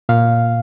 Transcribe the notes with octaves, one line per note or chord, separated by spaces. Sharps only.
A#2 F5